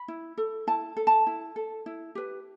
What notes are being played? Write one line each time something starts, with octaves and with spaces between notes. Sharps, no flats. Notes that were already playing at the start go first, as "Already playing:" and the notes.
Already playing: B5
E4
A4
E4 A5
A4
A5
E4
A4
E4
G4 B4